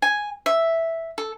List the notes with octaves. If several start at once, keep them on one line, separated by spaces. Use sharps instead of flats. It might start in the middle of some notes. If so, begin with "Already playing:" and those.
G#5
E5
A4